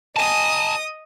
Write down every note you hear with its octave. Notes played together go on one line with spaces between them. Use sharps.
D#5 G#5 A5 D#6